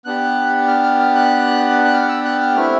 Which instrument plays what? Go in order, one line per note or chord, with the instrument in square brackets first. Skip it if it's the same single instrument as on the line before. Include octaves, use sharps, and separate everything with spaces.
[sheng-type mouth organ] B3 D4 G4 F#6
F6
F6
F6
F#6
F#6
F6
E6
F#6
F6
A3 C4 E4 F6